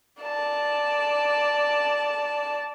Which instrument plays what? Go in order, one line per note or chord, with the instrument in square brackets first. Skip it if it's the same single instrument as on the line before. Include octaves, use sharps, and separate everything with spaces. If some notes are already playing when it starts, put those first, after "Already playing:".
[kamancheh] D5 A5